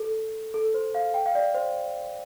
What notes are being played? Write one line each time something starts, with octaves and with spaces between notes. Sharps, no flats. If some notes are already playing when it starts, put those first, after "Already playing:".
Already playing: A4
A4
C5
F5
G5
F5
D5
C5